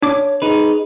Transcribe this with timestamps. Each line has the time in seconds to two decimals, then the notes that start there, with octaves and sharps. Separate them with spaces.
0.02 D4 C#5 D6
0.42 D#4 G#4 B4